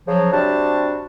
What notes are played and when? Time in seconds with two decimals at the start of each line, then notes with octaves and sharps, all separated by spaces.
0.07 C#3 F3 F#3
0.33 C3 G3 D4 F#4 A5